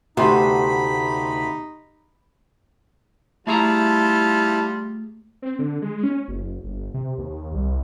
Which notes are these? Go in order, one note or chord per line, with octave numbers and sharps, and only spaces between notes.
D2 C3 B3 D#4 G4 B5 C6
G3 A3 E4 F4 G#4 A5 A#5
C4
D3
G#3
C#4
F#1
G1
C3
D#2
C2